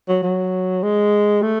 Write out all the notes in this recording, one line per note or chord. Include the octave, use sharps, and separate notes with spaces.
F#3
F#3
G#3
A3